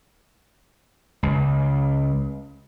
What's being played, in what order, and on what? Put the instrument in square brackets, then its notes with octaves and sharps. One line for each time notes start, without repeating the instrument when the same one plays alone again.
[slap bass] C#2